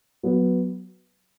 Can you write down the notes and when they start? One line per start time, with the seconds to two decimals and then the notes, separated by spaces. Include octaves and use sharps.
0.23 F#3 B3